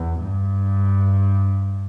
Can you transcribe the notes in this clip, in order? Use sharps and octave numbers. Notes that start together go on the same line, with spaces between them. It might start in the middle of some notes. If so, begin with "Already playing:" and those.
Already playing: E2
G2